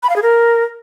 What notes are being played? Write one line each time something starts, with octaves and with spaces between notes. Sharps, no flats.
B5
F5
G#4
A#4